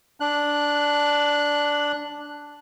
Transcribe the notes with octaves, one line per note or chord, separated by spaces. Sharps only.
D4 F#6